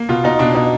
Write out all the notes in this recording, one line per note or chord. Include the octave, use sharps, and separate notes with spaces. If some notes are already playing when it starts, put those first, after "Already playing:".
Already playing: A#3
B2 F4
B2 D#4
B2 D4
B2 D#4